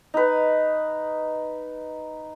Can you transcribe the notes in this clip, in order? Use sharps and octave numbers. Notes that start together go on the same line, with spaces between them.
D#4 B4